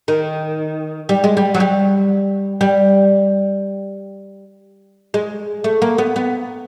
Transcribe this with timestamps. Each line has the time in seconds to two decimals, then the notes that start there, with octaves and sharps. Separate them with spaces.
0.08 D#3
1.09 G3
1.24 G#3
1.37 G3
1.54 F#3
1.60 G3
2.61 G3
5.14 G#3
5.64 A3
5.82 A#3
5.98 B3
6.16 B3